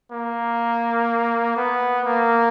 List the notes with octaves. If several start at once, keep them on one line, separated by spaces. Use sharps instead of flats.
A#3
B3
A#3